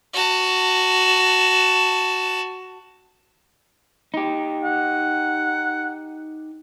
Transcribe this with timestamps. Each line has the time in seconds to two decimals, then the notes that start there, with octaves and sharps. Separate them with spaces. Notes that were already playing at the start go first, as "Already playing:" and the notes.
0.13 F#4 A5
4.14 D#4 G4
4.64 F#5